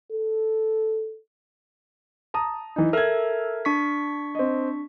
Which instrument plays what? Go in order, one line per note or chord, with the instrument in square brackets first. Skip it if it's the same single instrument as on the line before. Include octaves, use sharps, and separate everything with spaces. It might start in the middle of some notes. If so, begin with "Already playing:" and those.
[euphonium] A4
[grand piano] A5 A#5 D#6
E3 D#4
[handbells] A4 A#4 E5 [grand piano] F6 G#6
[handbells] D4 C#6 B6
[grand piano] C4 D#5